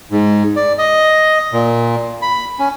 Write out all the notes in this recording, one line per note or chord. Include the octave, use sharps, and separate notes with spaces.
G#2
D5
D#5
A#2
B5
C#4